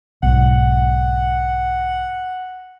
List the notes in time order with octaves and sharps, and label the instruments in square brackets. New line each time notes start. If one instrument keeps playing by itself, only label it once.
[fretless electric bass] B1 G#2 [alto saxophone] F#5